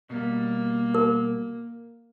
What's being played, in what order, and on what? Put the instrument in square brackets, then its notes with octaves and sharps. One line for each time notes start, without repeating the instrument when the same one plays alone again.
[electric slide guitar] B2 G3 [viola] A#3
[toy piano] A#4